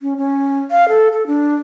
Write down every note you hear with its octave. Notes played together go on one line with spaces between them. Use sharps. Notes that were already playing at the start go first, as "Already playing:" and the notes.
C#4
C#4
F5
A4
A4
D4